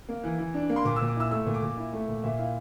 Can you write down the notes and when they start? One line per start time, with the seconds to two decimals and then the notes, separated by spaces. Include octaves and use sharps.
0.09 A#3
0.24 E3
0.39 E3
0.54 D4
0.69 A#3
0.76 C6
0.85 A#2 D6
0.96 A#2 E6
1.08 D6
1.16 E4 E6
1.31 A3 E6
1.46 A#2
1.54 D6
1.62 A#2
1.77 E4
1.93 A3
2.08 A#2
2.23 A#2 E5
2.39 E4 F5